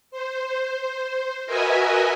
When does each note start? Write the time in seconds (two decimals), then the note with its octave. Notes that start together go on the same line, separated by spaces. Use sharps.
0.11 C5
1.46 F#4 A#4 B4 D#5 E5 G#5